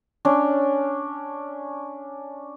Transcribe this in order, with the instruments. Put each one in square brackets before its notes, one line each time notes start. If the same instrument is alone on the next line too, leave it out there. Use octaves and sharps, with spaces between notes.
[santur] C#4 D4